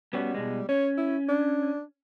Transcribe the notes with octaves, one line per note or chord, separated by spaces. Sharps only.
G3 B3 C#4 F#4
B2 G#3
C#4 C#5
E4
D4